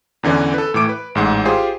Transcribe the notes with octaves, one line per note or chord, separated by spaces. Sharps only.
E2 D3 E3 C#4 D5
A4 B4
A2 E3 D6 D7
B4
A1 G#2 F#5
F4 G4 G#4 C5